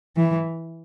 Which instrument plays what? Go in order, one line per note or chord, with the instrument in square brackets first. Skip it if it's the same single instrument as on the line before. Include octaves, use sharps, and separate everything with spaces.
[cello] E3